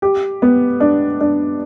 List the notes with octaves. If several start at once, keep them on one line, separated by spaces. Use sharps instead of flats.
G4
B3
D4
D4